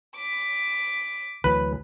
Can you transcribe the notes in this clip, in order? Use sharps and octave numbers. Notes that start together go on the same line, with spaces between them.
D6 B6
D2 E3 F#3 B4